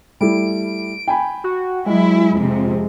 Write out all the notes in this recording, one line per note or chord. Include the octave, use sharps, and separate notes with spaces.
G3 A3 E4 D7
G5 G#5 B5
F#4
F#3 G#3 E4
F2 C3